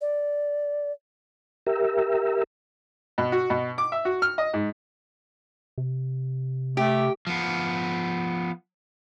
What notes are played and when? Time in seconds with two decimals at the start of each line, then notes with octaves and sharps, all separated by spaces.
0.01 D5
1.67 G4 A#4 E5
3.18 B2
3.32 F#4
3.50 B2
3.78 D6
3.92 E5
4.05 F#4
4.22 F6
4.38 D#5
4.54 G#2
5.78 C3
6.77 A3 G4
7.27 F3 B3